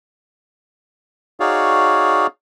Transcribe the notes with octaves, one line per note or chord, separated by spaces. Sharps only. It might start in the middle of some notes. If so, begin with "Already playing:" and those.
D#4 F#4 G#4 C#5 D5 F5